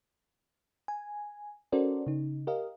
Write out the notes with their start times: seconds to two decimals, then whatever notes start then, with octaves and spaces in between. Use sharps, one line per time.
0.88 G#5
1.72 C#4 F#4 A4 A#4 C5 D5
2.07 C#3 D#4
2.47 G4 A#4 D#5 F5